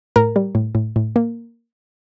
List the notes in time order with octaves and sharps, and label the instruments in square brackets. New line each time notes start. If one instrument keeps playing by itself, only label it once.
[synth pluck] A2 A#4
G3
A2
A2
A2
A#3